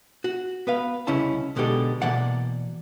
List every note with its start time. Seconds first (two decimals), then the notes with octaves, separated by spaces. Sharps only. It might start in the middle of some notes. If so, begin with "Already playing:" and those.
0.24 F#4
0.67 B3 B4 F5
1.07 C2 C#3 C#4 E4 D#5 A5
1.56 B1 B2 D3 G#3 G4 A4
2.02 B2 E3 A#3 D5 F#5